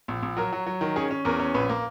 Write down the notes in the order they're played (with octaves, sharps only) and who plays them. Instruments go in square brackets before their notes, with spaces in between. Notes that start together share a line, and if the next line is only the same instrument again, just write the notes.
[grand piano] A#1
A#1
F#3 A#4
F#3
F#3
D#3
C#4 G#4
C#4
E2 A#4
C#4
A#1 B4
A#3